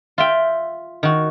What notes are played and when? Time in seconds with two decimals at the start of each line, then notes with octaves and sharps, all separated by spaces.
0.18 F4 E5 G5
1.03 D#3 F#4